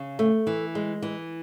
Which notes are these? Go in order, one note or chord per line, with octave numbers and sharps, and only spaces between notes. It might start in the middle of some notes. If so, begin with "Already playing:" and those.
Already playing: C#3
A3
E3
G#3
E3